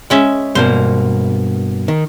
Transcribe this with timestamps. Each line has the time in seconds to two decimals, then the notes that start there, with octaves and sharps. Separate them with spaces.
0.10 G#3 C#4 E5
0.55 G2 B2 A#3 C5
1.88 D#3